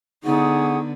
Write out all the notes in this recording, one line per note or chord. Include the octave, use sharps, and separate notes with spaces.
D3 B3 D#4 G#4 F#5 C#6